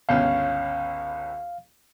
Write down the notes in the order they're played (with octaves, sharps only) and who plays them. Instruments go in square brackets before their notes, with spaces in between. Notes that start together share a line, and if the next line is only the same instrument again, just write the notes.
[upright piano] G1 C#2 C#4 [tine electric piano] F5